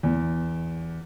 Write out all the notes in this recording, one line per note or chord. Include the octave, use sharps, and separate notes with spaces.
E2